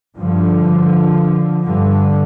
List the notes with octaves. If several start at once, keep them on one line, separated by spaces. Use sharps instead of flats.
G2 D3 F3
G2 D3